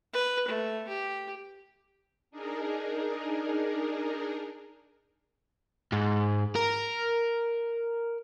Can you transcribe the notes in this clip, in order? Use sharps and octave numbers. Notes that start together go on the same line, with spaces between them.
B4
A3
G4
D4 D#4 G#4 A#4
G#2
A#4